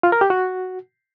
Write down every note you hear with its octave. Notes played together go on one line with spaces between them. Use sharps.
F4
A#4
G4
F#4